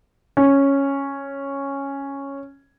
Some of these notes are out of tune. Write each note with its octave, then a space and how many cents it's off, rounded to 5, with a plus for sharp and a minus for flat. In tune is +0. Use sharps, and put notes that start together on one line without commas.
C#4 -5